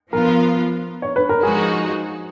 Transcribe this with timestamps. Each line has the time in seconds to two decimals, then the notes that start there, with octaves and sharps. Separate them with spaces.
0.13 F3 B3 F4 A#4
1.02 C#5
1.16 B4
1.29 A#4
1.43 F3 G#3 D#4 F#4 G#4